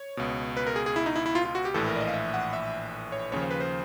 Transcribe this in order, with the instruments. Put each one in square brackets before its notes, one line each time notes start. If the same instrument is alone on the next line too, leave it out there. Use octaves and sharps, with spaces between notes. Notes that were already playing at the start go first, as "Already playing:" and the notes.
Already playing: [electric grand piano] C#5
C#2 B2
B4
A#4
G#4
G#4
E4
D#4
E4
E4
F4
F4
F#4
G4
A#1 A2 E3 A4
A#4
D5
D#5
F5
E5
F#5
E5
C#5
D#2 C#3 F3 C#5
C5
B4
C5